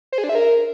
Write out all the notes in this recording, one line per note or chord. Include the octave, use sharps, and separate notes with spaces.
C5
G#4
D4
E5
A#4